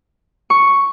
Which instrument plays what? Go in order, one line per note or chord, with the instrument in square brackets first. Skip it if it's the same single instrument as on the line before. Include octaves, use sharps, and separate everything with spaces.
[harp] C#6